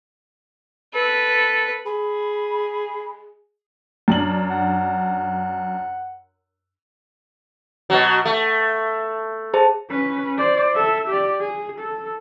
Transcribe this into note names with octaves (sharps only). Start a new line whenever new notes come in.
A4 B4
G#4 B5
F#2 D4 F#7
F#5
B2 F#3
A3
G#4 C5 A5
C#4 B4
C5 D5
A4 E5
G4 D5
G#4
A4